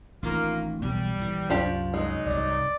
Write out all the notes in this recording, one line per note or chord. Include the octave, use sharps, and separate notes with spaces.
A1 D#3 A#3 F4
B1 E2 B2 G3
A#1 E3
C2 F#2 F3 D4 G4
F#3 G#3 D#4
C2 G2 D5